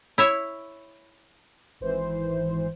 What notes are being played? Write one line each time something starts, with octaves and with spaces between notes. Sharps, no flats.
E4 C#5 E5
G#1 E3 C5